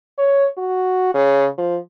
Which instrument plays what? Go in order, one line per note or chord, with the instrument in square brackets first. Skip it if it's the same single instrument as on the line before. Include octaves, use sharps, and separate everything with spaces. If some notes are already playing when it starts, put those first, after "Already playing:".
[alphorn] C#5
F#4
C#3
F3